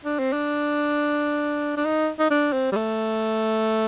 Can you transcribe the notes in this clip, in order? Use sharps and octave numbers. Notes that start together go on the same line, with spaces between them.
D4
C4
D4
D4
D#4
D#4
D4
C4
G3
A3